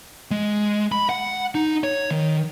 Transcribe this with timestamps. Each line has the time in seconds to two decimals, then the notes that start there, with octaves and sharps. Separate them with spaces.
0.31 G#3
0.92 B5
1.09 F#5
1.55 D#4
1.84 C#5
2.11 D#3